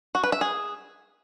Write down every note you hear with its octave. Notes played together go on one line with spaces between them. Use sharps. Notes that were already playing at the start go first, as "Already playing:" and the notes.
F#4
B4
E5
G#4